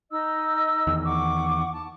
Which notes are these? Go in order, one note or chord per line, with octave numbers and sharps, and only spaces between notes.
D#4 D#5 E6
E2 D#3
F#5 C#6 D6
A5